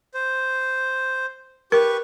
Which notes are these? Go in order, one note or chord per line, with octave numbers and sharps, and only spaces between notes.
C5
G4 A#4 B4 C#6